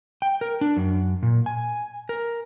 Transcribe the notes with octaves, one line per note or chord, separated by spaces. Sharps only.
G5
A#4
D4
F#2
A#2
G#5
A#4